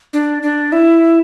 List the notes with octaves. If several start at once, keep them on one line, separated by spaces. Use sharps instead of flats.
D4
D4
E4